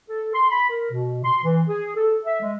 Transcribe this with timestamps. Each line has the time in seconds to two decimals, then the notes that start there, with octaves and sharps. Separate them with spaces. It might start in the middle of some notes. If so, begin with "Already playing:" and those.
0.09 A4
0.34 C6
0.50 B5
0.70 A#4
0.92 B2
1.24 C6
1.44 E3
1.68 G#4
1.96 A4
2.25 E5
2.41 G#3